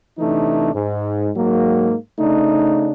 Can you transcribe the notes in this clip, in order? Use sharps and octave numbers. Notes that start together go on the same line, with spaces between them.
C3 E3 A3 D4 D#4
G#2
G#2 F#3 A#3
C#3 A3 D4 D#4